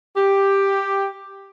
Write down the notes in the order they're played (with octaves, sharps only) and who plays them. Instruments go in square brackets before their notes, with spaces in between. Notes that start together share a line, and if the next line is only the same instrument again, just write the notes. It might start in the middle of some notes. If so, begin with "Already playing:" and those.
[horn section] G4